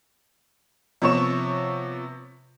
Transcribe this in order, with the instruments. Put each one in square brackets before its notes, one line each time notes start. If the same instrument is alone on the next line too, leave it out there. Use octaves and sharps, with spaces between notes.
[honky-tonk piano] C3 F3 B3 C#5 C#6 E7